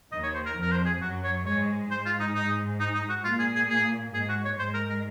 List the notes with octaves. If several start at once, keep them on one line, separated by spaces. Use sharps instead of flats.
D#2 D#3 D#5
C#5
C5
A#4
F2 F3
A#4
C5
G#4
F#2 F#3 F#4
C#5
G#2 G#3 C#5
G#2 G#3 C5
F4
D#4
D#4
D#4
D#4
F#4
A#2 A#3 F4
G#4
G#4
G#4
G#2 G#3 G#4
F#4
C#5
G#2 G#3 C5
A#4
A#4